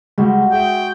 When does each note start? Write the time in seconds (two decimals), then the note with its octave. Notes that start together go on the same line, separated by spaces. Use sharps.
0.18 C#2 G3 G#3 F#4
0.52 G#3 G#4 E5 G5